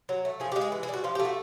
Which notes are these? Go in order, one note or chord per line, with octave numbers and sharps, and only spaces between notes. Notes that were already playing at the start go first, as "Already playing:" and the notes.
F#3
A3
F3 G#4
G4
G#3
G#4
E3
G#4
G3 F#4
F3 F4
G4
A3
F#4